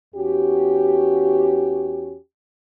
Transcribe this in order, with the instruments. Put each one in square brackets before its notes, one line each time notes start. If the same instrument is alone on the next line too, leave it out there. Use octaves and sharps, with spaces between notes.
[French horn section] E2 C#4 F#4 G4